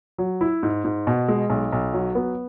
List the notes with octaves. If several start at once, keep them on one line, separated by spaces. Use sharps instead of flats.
F#3
E4
G#2
G#2
B2
G#3
B1
B1
F#3
B3